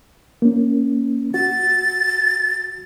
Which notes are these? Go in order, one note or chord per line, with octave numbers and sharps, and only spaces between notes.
A#3 C#4
F#4 A6